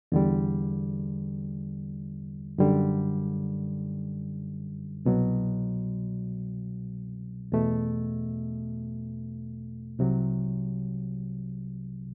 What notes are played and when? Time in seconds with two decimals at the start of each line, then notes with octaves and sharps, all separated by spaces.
0.12 E2 D3 G3
2.58 F#2 D3 G3
5.05 C2 B2 F#3
7.52 E2 B2 A3
9.99 C2 C3 F#3